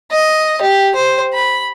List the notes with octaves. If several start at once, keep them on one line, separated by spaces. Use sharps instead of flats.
D#5
G4
C5
B5